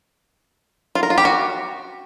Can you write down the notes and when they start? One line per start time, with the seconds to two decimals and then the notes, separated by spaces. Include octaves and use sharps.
0.95 F4
1.03 A#4
1.10 F4
1.18 G4
1.25 F#4